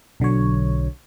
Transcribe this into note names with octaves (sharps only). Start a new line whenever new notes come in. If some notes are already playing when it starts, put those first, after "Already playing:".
B1 D3 F#3 C#5